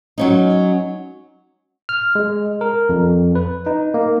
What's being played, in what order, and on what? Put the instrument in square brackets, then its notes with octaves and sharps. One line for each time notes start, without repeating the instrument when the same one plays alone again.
[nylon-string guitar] F#3 C#4 D#4
[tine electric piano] F6
G#3
A#4
F2
B4
D#4
A#3